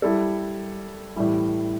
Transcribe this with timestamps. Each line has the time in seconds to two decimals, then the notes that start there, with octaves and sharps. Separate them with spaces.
0.02 G3 E4 A4
1.16 A2 E3 G3 E4